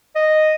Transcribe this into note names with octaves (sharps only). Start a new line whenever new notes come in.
D#5